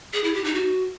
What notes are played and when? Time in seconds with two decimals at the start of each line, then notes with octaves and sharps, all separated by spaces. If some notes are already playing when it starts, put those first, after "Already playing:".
0.14 G#4
0.24 E4
0.34 G4
0.44 D#4
0.55 F#4